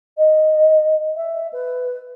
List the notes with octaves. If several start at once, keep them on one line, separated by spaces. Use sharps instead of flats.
D#5
E5
B4